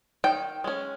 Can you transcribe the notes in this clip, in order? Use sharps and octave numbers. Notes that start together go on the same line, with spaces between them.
D#3 G5
G#3 C#4